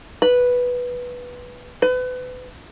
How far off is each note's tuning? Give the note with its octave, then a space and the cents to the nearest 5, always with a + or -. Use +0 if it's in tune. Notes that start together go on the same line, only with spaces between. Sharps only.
B4 -5
B4 +35